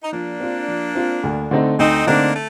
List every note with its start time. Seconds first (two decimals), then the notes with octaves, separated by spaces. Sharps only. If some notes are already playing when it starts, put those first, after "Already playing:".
0.02 D#4
0.13 F3 A#3 D4
0.40 C4 F4
0.68 F3
0.95 C4 F4
1.23 D2
1.51 D3 A3 C4 D#4
1.79 D2 C4 D#4
2.06 D3 A3 A#3 C4 D4 D#4
2.33 A3